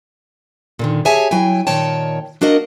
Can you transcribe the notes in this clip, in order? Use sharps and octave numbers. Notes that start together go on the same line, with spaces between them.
A#2 D3 D#3
G4 G#4 C#5 E5 G#5 A5
F#3 E4 G5 G#5
A#2 D#3 C#5 G5 A5
A#3 D4 F#4 A#4 D#5 F#5